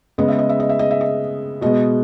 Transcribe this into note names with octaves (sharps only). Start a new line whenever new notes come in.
C#3 G#3 B3 D#5
E5
D#5
E5
D#5
E5
D#5
E5
D#5
B2 G#3 B3 D#5